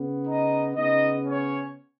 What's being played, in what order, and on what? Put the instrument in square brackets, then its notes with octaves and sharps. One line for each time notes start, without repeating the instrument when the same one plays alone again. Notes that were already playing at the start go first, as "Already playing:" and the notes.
Already playing: [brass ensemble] C#3 B3
D#4 D#5
C#3 B3 D#4 D#5
C#4 C#5